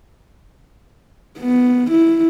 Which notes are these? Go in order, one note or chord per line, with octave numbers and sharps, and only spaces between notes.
B3
E4